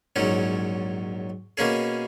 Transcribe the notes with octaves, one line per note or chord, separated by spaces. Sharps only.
A#1 G#2 F#3 C#4
B2 A#3 C#4 G#4